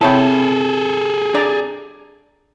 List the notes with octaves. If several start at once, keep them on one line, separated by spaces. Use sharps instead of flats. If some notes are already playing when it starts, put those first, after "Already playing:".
C3 E4 G#4 A4 C#5 G5 A5
D4 D5 A#5